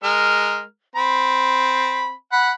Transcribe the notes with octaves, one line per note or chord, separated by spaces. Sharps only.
G#3 A#4 F6
C4 B5
F#5 B5